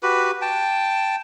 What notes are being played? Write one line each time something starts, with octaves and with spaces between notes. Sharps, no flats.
F#4 G4 B4 B5
G5 A5